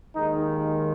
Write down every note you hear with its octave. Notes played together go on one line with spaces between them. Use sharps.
D#2 D#3 G#3 D#4